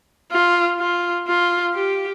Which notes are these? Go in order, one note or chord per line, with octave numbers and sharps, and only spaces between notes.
F4
F4
F4
G4